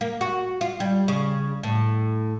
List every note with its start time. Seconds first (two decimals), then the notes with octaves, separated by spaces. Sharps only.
0.01 A#3
0.21 F#4
0.61 F4
0.80 G3
1.08 C#3
1.63 A2